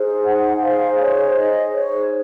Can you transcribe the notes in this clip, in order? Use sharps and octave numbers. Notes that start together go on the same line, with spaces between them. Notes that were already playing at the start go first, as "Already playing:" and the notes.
Already playing: D#4 G#4 C5
F#5
F5
C#5
D#5
C#5